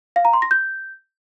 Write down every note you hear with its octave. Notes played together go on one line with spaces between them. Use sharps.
F5
A#5
C6
A#6
G6